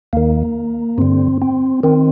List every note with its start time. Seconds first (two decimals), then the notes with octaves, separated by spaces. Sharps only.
0.13 D#2 D#3 A#3
0.98 G2 D3 C4
1.42 C4
1.83 D#3 C4